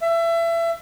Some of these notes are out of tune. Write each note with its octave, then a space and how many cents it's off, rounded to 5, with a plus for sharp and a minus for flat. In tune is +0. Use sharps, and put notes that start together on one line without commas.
E5 +25